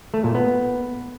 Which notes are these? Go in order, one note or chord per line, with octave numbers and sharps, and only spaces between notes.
A3
A#2
B3